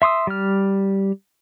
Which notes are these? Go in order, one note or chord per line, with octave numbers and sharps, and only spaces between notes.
E5 C6 D#6 E6
G3 F6